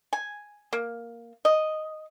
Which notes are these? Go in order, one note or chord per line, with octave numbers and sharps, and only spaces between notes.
G#5
A#3
D#5